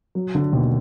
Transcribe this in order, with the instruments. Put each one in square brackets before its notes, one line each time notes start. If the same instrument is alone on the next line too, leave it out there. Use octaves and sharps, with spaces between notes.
[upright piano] F#3
D3
[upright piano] D#2 [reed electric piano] B2